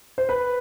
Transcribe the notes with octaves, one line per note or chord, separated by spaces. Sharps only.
C5
B4